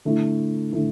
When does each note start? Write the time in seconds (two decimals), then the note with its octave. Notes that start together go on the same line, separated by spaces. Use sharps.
0.05 D3 A3 E4
0.72 D3 A3 E4